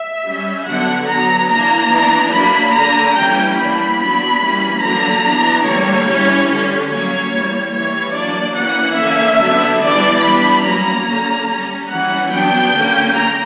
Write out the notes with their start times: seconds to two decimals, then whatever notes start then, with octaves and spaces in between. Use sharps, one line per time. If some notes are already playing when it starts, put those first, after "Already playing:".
Already playing: E5
0.24 G3 C#4
0.66 D3 F#3 B3 D4 F#5
1.08 F#3 B3 D4 A#5
1.49 E3 A#3 D4 A#5
1.90 E3 B3 D4
2.32 F#3 A#3 D4 B5
2.73 D3 A#3 D4 A#5
3.15 E3 G3 A#3 C#4 G5
3.57 E3 A#3 D4 B5
3.99 F#3 B3 D4 B5
4.41 E3 G3 A#3 C#4
4.82 D3 F#3 A#3 D4 A#5
5.23 E3 B3 D4
5.65 D3 G3 A#3 C#5
6.07 E3 G3 C#4
6.49 D3 G3 C#4
6.90 F#3 A#3 C#4 C#5
7.32 E3 G3 A#3
7.74 E3 G3 A#3 C#5
8.15 F#3 A#3 D4 D5
8.56 E3 A#3 C#4 F#5
8.98 D3 A#3 C#4 E5
9.40 D3 F#3 B3 D4
9.82 E3 G3 B3 D4 D5
10.23 G3 B3 D4 B5
10.65 F#3 A#3 C#4 A#5
11.07 D3 A#3 C#4
11.49 G3 C#4
11.90 E3 G3 C#4 F#5
12.31 F#3 B3 D4 G5
12.73 D3 A#3 C#4
13.15 A#5